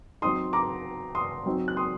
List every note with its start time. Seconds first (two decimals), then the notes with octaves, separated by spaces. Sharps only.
0.22 F#3 C4 D#4 C6 D#6
0.53 A#5 D6
1.15 C6 D#6
1.46 F#3 C4 D#4
1.68 F#6
1.77 C6 D#6